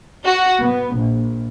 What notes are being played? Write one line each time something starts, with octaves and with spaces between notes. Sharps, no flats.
F#4
B3
A#1